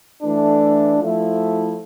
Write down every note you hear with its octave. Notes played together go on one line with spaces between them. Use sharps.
E3 A3 D4
F3 A3 E4